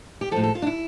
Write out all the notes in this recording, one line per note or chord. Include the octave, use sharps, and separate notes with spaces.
G4
A2 F3 A4
A4
F4
D4
E4